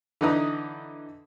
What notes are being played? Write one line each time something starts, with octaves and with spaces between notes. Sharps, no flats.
D3 E3 D#4 B4 A#5 D#6